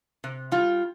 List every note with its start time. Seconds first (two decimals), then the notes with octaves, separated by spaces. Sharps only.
0.24 C3
0.52 G3 F4